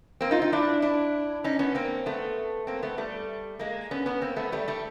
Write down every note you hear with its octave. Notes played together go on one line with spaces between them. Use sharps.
A#3 C4
D#4 F4
D#4 F4
D4 E4
D4 E4
C#4 D#4
B3 C#4
A#3 C4
A3 B3
A#3 C4
A3 B3
G3 A3
G#3 A#3
B3 C#4
B3 C#4
A#3 C4
A3 B3
G3 A3
G3 A3